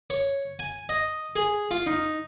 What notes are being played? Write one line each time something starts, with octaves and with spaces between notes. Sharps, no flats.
C#5
G#5
D#5
G#4
F4
D#4